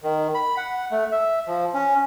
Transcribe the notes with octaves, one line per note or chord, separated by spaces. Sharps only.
D#3
B5
F#5
A3
E5
F3
C#4